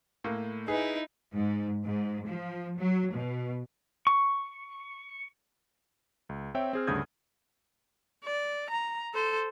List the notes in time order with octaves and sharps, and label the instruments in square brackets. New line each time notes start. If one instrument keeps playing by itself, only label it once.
[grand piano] A2 A#3
[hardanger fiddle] D#4 E4 [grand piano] G#4 B4
[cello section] G#2
G#2
F3
F#3
B2
[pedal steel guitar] C#6
[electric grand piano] C#2
C4 C#5 E5 G5
C4 G#4 F6
D2 G2 C#3 D#6 G6 G#6
[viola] D5
A#5
A4 C5